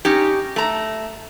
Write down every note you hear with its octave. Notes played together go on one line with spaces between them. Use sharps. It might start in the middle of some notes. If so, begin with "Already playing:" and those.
C#4 D#4 G4
A3 A#5